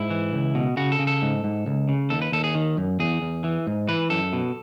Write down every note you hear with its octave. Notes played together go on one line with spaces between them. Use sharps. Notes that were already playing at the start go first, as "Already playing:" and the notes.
Already playing: G#2 E4
E3
C#2
B2
C#3 F#4
A4
C#3
A4
G#2
G#2
C#2
C#3
D#2 A4
B4
D#2 A4
G#4
D#3
F#2
E2 G#4
E2
E3
G#2
E3 B4
F#2 A4
B2